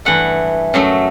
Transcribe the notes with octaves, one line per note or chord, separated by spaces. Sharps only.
G2 E3 A3 F#5
F#2 F#3 A3